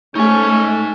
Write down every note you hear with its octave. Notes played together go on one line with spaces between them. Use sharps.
A3 C#4 D#4 G#5